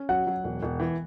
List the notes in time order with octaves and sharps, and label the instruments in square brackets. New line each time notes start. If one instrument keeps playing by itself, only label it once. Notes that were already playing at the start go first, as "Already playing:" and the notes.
Already playing: [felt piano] C#4
[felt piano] F#3 [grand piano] F#5
[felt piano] F#3
E1
E1
E3